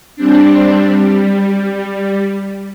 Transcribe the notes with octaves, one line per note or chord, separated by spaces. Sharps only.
G3 C4 D4
G3